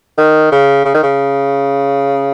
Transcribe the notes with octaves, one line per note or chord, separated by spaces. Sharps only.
D#3
C#3
C#3
D#3
C#3